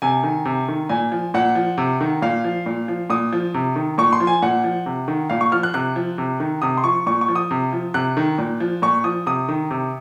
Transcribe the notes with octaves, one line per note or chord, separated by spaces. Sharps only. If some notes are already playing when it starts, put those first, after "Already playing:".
C3 G#5
D#3
C3
D#3
A#2 G#5
F3
A#2 F#5
F3
C3
D#3
A#2 F5
F3
A#2
F3
A#2 D#6
F3
C3
D#3
A#2 C#6
C6
F3
G#5
A#2 F#5
F3
C3
D#3
A#2 F5
C#6
F3 F6
F#6
C3 F#6
F3
C3
D#3
C3 D#6
C6
F3 C#6
A#2 C#6
C#6
F3
D#6
C3
F3
C3 F#6
D#3
A#2
F3
A#2 C#6
F3 D#6
C3 D#6
D#3
C3